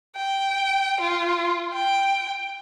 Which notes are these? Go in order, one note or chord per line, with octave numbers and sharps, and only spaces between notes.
G5
F4
G5